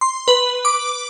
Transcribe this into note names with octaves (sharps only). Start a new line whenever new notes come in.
C6
B4
D6